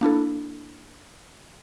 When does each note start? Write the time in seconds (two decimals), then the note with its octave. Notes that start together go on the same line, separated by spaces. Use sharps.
0.01 A#3 D4 E4 A4